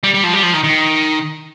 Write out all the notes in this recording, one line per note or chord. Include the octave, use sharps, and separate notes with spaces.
G3
G3
F3
G3
F3
D#3
D#3